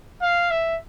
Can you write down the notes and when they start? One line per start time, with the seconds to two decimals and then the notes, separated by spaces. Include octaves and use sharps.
0.22 F5
0.51 E5